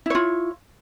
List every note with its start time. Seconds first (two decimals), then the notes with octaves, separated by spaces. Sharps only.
0.06 E4
0.10 C#5
0.15 F4